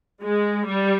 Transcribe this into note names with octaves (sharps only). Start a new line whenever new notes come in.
G#3
G3